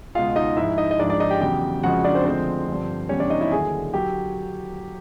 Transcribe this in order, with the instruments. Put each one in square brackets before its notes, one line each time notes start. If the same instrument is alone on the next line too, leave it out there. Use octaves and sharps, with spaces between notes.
[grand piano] C#2 B2 G#3 F4 F5
D#4 D#5
G#2 F3 G#3 E4 E5
D#4 D#5
D#5
G#2 F3 G#3 D4 D5
D4 D5
D#4 D#5
G4 G5
E2 C#3 F#3 G4 G5
F2 C#3 F3 G#3 F#4 F#5
D4 D5
C4 C5
D2 D3 F3 G#3 C4 C5
G2 D3 F3
E2 B2 G3 C#4 C#5
D4 D5
D#4 D#5
E4 E5
D#2 D3 F#3 G#4 G#5
D3 F#3 G4 G5